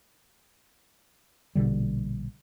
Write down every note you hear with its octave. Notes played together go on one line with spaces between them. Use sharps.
A#1 B2 D3 G3